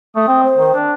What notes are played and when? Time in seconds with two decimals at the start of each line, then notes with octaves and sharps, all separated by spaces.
0.16 A3 D#6
0.28 C4
0.44 C5
0.57 D#3
0.74 D4